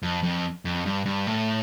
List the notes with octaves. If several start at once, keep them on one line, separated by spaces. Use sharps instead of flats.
F2
F2
F2
G2
G2
A2